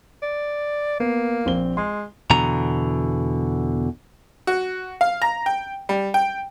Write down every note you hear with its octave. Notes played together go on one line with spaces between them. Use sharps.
D5
A#3 B3
A#1 C4 G7
G#3 C6
E2 B2 D3 A#5
F#4
F5
A#5
G5
G3
G5